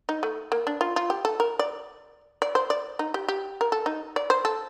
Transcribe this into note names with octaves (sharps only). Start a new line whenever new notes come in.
D#4
A3
A#3
D4
F4
F4
G4
A4
A#4
D5
D5
C5
D5
D#4
G4
G4
A#4
A4
D#4
D5
C5
A4